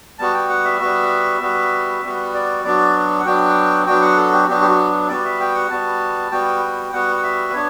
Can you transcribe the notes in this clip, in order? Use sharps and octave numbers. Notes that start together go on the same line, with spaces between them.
G3 B3 F#4 A5
G5
F#5
E5
G3 B3 F#4
G3 B3 F#4
G3 B3 F#4
D5
F#3 B3 D4 F#4 D5
F#5
F#3 B3 D4 F#4 G5
F#3 B3 D4 F#4 G5
F#5
A4
G4
F#3 B3 D4 F#4 G4
G4
F#4
G3 B3 F#4 D5
E5
G5
F#5
G3 B3 F#4 A5
G3 B3 F#4 G5
G5
G3 B3 F#4 F#5
F#5
E5
B4
B3 D4 C#5